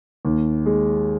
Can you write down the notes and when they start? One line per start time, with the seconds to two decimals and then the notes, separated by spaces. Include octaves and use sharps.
0.25 D#2
0.66 G#3